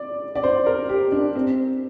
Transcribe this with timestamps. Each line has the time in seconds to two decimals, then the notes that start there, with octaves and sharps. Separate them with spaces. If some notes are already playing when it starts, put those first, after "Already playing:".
Already playing: D5
0.35 D5
0.43 C5
0.66 A#4
0.89 G4
1.12 D4
1.35 C4